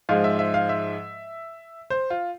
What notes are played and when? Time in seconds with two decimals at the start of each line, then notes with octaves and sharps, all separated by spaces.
0.09 G#2 F3 G#3 F5
0.24 E5
0.39 E5
0.54 F5
0.69 E5
1.90 C5
2.10 F4